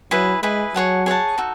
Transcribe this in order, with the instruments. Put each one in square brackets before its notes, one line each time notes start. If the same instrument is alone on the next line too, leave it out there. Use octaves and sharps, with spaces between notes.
[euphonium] F#3 [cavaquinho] E4 G#4 B4
[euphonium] G#3 [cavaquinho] E4 G#4 B4
[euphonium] F#3 [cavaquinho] G#4 C#5 F#5 A5
[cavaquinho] G#4 C#5 F#5 A5
D#4 F#4 A4